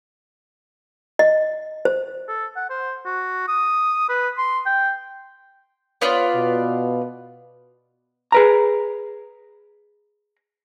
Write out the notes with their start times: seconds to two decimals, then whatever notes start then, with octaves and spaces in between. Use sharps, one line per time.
1.19 D#5
1.85 C5
2.28 A4
2.56 F#5
2.70 C5
3.05 F#4
3.48 D#6
4.09 B4
4.38 C6
4.66 G5
6.01 B3 F4 C#5 D5
6.35 B2
8.32 G#4 B4 A#5